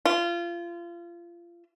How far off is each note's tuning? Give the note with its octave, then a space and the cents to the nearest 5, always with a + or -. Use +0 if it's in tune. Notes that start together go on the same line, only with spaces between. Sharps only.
F4 -25